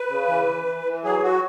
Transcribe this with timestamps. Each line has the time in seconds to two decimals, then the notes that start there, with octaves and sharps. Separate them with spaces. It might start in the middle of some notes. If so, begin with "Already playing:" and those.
Already playing: B4
0.09 C#3
0.27 E3
0.47 E3
0.65 E3
0.85 E3
1.04 F#3 G#4
1.23 F#3 F#4